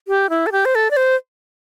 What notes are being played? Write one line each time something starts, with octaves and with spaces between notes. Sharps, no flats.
G4
E4
A4
G4
C5
A4
D5
C5